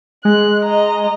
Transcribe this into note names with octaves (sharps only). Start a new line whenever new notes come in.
G#3 F#6
D#5 A#5